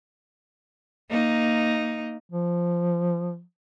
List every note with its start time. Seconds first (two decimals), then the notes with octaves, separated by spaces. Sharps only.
1.10 A#3 D#4
2.30 F3